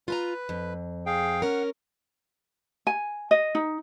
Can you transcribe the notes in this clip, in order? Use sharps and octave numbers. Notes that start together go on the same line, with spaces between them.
F4 B4 A5 A#5
F2
G#4 F5 G5
C#4 A#4 F#5
G#5
D#5
D#4